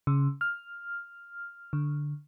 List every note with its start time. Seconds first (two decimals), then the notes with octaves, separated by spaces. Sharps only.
0.07 C#3
0.41 F6
1.73 D3